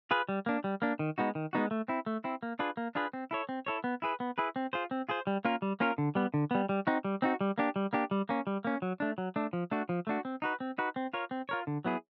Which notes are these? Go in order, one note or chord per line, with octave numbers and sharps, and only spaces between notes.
F4 G#4 B4
G3
A#3 D4
G3
A#3 D4
D#3
G#3 B3 D#4 F#4
D#3
G#3 B3 D#4 F#4
A3
C4 E4
A3
C4 E4
A#3
D4 F4 G#4 B4
A#3
D4 F4 G#4 B4
C4
E4 A4 C#5
C4
E4 A4 C#5
B3
E4 G#4 B4
B3
E4 G#4 B4
C4
F4 G#4 C5
C4
F4 G#4 C5
G3
A#3 C#4 F4 A#4
G3
A#3 C#4 F4 A#4
D3
G3 B3
D3
G3 B3
G3
C4 D#4 F#4
G3
C4 D#4 F#4
G3
A#3 D4 G4
G3
A#3 D4 G4
G3
A#3 C#4
G3
A#3 C#4
F#3
A3 D4
F#3
A3 D4
F3
A3 D4 F#4
F3
A3 D4 F#4
C4
D#4 F#4 B4
C4
D#4 F#4 B4
C4
F4 A#4 C#5
C4
F4 A#4 C#5
D3
F#3 B3 E4 G#4